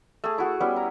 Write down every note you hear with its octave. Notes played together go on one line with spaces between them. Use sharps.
A3 G#4
E4 F#4 G#4
G3 B3 C#4 E4
A#5